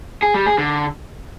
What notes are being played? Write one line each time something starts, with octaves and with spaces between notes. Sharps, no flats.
G#4
G3
G#4
D3